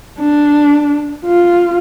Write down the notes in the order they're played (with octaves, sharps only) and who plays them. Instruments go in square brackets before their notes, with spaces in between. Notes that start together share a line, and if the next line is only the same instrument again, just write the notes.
[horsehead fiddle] D4
F4